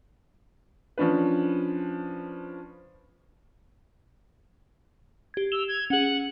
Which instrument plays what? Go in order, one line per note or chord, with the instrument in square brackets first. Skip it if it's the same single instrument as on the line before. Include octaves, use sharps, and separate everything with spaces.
[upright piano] F3 C#4 D4 B4
[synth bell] G4 G#6
[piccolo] E6 [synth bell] E7 F7 G7
[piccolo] G#6
[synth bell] C#4 G#4 [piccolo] F#5